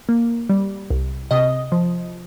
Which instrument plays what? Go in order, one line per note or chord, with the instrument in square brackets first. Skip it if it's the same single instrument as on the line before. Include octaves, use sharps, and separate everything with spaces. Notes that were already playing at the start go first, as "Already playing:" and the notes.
[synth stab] A#3
G3
C2
C3 D#5
F3